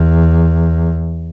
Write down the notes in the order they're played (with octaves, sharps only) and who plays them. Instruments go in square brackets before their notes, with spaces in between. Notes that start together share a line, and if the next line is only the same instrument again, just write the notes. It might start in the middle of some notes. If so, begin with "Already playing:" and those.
Already playing: [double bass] E2